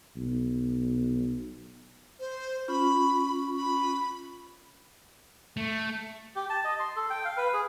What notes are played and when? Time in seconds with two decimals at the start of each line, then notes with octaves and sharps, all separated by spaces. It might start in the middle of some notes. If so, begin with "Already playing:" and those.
0.17 B1
2.19 C5
2.68 C#4 F4 B5 C#6
3.56 B5
5.57 A3
6.36 G4
6.50 A5
6.65 D#5
6.80 C6
6.96 A4
7.10 G5
7.25 F5
7.37 B4
7.54 G#4